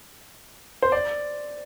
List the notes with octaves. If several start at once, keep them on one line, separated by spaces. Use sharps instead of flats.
C5
D5